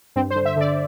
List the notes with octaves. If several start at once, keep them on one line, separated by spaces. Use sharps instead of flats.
G2 C4
C5
D3
E5
D3 D5